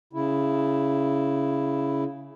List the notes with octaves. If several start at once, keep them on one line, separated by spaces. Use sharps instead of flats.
C#3 E4